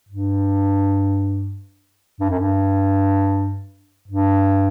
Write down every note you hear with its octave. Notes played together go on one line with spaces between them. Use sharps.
G2
G2
F#2
G2
G2